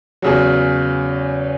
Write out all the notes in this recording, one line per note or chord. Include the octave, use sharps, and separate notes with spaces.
E2 C#3 F#3